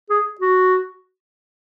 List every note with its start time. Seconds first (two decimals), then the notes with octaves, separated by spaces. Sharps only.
0.10 G#4
0.40 F#4